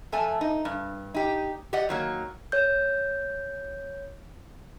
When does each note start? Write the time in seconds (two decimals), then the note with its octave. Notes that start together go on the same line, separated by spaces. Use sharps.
0.12 F2 A3 G#5 A5
0.41 D#4
0.65 G2
1.14 D#4 G4
1.73 G4 D5 D#5 F#5
1.89 D#3 F#3 A#3
2.52 C#5 G6